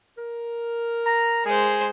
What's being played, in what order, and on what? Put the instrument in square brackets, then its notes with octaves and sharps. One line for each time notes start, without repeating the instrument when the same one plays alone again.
[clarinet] A#4
[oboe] A#5
[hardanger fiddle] G#3 C5 [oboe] G#4